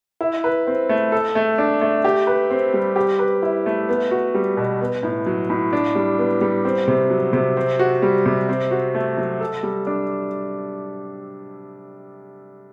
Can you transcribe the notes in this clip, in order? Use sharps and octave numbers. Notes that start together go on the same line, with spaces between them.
E4
B4
C4
A3
A4
A3
D4
A3
G4
B4
C4
G3
G4
B4
E4
A3
B3
F#4
G3
B2
B3
A2
F#3
A2
D4
G3
B3
G3
C4
C3
F#3
C3
C4
F#4
G3
C3
C4
F#4
A3
F#3
A4
G3
D4